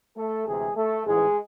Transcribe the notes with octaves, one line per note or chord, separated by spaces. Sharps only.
A3 A4
D2 C3 E3 G#3 G#4
A3 A4
A1 G#2 E3 G#3 G#4